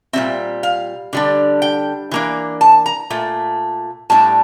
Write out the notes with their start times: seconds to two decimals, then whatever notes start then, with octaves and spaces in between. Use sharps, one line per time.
0.13 A#2 G3 C4 E5
0.63 F5
1.13 D3 G3 D4
1.62 G5
2.11 E3 A#3 D4
2.61 A5
2.86 A#5
3.10 A#2 A3
4.10 A2 G3 D4 A5